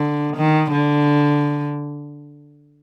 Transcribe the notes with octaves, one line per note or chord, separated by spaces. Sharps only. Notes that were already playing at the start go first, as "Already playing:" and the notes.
Already playing: D3
D#3
D3